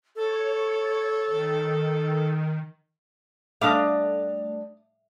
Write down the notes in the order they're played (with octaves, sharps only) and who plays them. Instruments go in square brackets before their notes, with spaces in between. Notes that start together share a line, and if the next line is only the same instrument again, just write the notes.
[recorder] A4 [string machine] C#5
[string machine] D#3
[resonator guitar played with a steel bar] G3 D4 D#5 [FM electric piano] A3 [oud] F5 [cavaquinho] D6 D#6